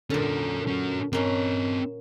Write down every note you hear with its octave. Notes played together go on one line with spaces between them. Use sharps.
A#2 D3 C#4 A#4
C#4 F#4
A#3 C4 C#4 D#5